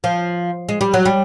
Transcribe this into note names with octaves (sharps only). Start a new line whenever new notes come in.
F3
G#3
G3
F#3
G3